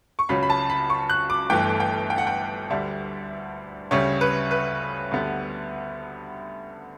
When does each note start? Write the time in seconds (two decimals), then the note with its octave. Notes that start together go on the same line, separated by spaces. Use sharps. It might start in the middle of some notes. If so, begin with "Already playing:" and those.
0.19 C#6
0.29 C#2 C#3 F#3 C#4 B5
0.43 B5
0.50 A5
0.70 B5
0.90 C#6
1.10 F#6
1.30 D6
1.50 G1 G2 E3 A3 G5
1.80 G5
2.10 G5
2.18 F#5
2.27 G5
2.70 D2 D3 G3 D4 E5
3.91 D2 C#3 G3 C#5
4.21 B4
4.51 B4
5.11 D2 D3 G3 B3